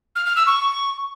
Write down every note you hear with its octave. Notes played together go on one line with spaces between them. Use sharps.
F6
F6
E6
C#6